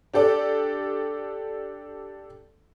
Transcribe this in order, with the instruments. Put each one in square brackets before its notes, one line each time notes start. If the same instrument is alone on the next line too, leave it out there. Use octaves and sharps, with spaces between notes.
[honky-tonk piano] D4 G4 A4 D5